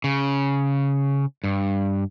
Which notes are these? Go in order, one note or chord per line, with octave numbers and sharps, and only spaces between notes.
C#3
G2